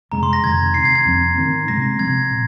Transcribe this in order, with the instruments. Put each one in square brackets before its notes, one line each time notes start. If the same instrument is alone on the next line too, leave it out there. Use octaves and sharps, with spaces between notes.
[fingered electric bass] F2 C3 G#3 [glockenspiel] A#5
[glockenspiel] C6
A#6
[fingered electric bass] F2 C3 D#3 [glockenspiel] G#6
[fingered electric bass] C3 D#3 C4 [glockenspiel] C7
[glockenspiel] G#6
G#6
[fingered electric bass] F2 F3 C4
G#2 D#3 C4
[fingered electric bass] C3 G#3 C4 [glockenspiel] A#6
[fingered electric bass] C3 F3 C4 [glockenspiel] G#6
[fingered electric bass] A#2